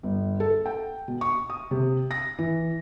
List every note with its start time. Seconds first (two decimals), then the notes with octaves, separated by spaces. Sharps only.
0.03 G1
0.40 A4
0.66 G5
1.08 B2
1.21 C#6
1.50 D#6
1.71 C3
2.11 A#6
2.39 E3